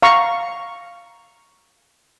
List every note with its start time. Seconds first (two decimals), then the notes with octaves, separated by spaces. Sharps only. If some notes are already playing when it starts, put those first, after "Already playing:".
0.03 F5 A#5 C#6